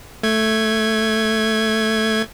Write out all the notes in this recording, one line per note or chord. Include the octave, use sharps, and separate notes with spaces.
A3 G#6